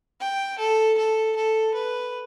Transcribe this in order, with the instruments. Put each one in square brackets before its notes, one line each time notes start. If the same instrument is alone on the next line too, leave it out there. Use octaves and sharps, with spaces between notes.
[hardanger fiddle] G5
A4
A4
A4
B4